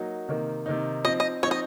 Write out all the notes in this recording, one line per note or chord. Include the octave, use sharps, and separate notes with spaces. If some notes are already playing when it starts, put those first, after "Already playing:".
Already playing: F#3 A#3 D#4
C3 D#3 A#3 D#4
C3 D#3 A#3 D#4
F3 C4 D#4 D#5
D#5
F3 C4 D#4 C#5
D#5